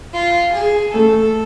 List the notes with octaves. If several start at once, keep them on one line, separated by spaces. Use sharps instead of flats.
F4
G#4
A3 A4